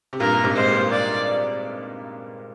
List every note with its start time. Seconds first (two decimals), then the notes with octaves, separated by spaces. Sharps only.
0.13 C3
0.20 G2 A#2 A#4
0.44 G#2 C3
0.56 G#3 C5
0.68 G3 A#3
0.91 D5